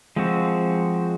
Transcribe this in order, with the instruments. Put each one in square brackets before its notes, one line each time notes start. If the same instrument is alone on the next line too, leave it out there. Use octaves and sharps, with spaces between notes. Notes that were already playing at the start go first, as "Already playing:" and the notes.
[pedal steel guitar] F3 G#3 C4 F#4